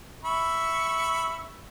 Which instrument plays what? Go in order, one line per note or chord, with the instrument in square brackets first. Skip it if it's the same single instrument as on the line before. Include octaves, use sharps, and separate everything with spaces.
[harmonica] E5 B5 C#6